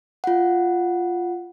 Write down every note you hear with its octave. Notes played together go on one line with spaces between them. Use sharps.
F4 F#5